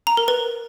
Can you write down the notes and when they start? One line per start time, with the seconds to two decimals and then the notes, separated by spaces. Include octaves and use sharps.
0.07 A#5
0.17 A#4
0.28 B4